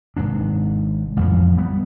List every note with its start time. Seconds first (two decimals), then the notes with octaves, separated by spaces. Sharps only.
0.17 G#1 G#2 C3 D4
1.17 A1 F2 F3
1.57 G3 B3